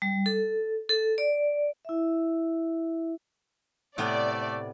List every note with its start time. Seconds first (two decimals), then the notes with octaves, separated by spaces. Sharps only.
0.02 G3
0.26 A4
0.89 A4
1.18 D5
1.85 E4 E5
3.98 A2 C3 A3 B3 D5